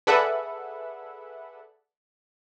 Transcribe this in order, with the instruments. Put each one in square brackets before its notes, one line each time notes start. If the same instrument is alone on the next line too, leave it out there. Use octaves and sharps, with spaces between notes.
[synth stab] G#4 A4 B4 D5 E5 F#5